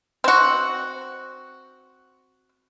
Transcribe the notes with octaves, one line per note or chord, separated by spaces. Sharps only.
C4 F#4